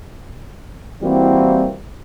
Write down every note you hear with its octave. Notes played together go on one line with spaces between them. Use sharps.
E3 G3 A#3 C4 E4 F#4